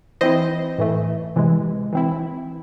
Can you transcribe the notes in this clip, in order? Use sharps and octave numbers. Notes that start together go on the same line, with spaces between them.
E3 C4 E4 C5 D#5
A2 E3 A3
C3 E3 G#3
E3 C4 E4